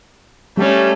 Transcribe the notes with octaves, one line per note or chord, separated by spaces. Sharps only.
G3 A3 C#4